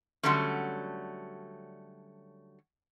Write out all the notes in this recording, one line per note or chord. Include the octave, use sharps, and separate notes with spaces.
D3 F#3 G3 A3 C#4